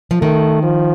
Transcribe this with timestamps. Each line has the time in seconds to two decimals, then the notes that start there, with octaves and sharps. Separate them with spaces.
0.11 F3
0.21 D#3 A3
0.63 F3